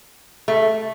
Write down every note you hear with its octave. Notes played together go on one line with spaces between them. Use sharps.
A3